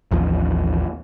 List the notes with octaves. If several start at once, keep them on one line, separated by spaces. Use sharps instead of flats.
A1 D#2 F3